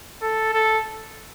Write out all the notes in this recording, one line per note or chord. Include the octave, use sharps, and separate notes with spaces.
A4
A4